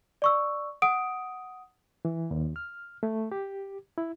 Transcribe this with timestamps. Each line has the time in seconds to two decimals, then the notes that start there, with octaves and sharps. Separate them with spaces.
0.22 D5 C#6 E6
0.82 F#5 D#6 D7
2.05 E3
2.31 D#2
2.56 F6
3.03 A3
3.32 G4
3.98 E4